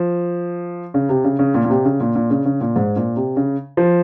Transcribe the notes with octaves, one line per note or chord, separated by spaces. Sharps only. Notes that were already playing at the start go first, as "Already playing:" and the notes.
Already playing: F3
C#3
C3
C#3
C#3
A#2
A#2
C3
C#3
A#2
A#2
C#3
C#3
A#2
G#2
A#2
C3
C#3
F3